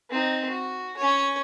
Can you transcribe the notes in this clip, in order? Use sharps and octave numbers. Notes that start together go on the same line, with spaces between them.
C4 D#4
F#4
C#4 C#5